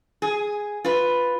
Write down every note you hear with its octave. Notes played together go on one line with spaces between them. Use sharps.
G#4
F4 B4